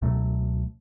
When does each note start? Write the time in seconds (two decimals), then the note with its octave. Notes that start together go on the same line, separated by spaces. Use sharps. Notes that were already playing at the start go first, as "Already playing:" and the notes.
0.02 C#2 B2 F#3 A3